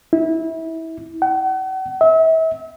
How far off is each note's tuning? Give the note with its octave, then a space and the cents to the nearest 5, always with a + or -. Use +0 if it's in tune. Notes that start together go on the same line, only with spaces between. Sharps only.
E4 -25
F#5 +40
E5 -35